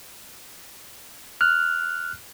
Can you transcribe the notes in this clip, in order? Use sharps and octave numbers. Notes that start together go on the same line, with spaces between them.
F6 F#6